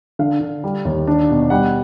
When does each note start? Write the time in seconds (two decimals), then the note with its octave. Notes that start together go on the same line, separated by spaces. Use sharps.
0.19 D3 F5
0.41 D3
0.64 G3
0.85 D#2
1.07 D4
1.29 B2
1.50 G3 F#5